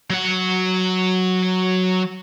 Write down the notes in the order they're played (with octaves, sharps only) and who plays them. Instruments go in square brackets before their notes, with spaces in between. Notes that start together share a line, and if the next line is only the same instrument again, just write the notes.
[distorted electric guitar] F#3 F#5